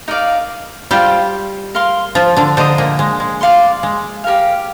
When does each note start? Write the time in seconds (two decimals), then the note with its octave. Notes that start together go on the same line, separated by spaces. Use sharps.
0.08 D#4 A#4 D5 F5
0.91 G3 F4 G4 C5 G5
1.75 A#4 F5 C6
2.15 F3 F4
2.36 D3 D4
2.57 D3 D4 C5 D#5 A#5 D#6
2.78 A#2 A#3
2.99 G#3
3.20 G#3
3.41 D5 F5 C6
3.83 G#3
4.24 G4 A#4 F5